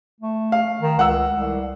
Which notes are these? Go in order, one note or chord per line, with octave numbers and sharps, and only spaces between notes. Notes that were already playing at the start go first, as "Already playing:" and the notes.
A3
F5
D#3
C#2 F#5 E6
C2